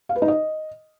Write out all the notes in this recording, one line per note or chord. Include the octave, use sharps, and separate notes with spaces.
F5
B4
D#4
D#5